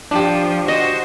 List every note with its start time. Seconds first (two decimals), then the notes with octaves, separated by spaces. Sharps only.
0.11 F3 D4 G4
0.68 F#4 C5 D#5